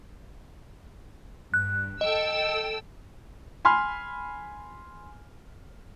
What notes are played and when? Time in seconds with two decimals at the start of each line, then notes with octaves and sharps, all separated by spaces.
1.54 G2 F#6
2.01 A4 D#5 G5 E6
3.65 G#5 B5 C6 F6